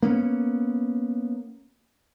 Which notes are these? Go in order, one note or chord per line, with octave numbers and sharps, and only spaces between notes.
A#3 B3 C#4